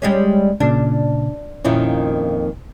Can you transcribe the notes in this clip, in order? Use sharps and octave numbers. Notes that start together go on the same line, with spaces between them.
G3 G#3 C#4
A#2 C#3 D4
F2 A#2 D#3 C#4 E4 F4